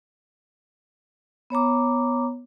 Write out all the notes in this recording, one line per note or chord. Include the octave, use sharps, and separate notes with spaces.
B3 C#5 A#5 D6